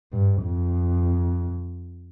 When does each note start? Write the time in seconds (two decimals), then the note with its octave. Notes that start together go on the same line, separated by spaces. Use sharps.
0.13 G2
0.43 F2